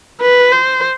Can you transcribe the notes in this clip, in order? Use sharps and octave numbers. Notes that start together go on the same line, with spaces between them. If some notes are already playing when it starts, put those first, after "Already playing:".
B4
C5